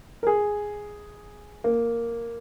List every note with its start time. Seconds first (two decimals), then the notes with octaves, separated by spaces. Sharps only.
0.23 A#4
0.27 G#4
1.64 A#3